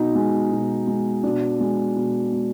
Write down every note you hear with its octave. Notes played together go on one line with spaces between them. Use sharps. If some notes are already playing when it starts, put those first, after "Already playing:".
Already playing: B2 D#4
G#3
B2
G#3
B2 D4
G#3
B2
G#3